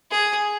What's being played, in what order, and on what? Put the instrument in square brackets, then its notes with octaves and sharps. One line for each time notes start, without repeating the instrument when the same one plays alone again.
[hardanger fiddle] G#4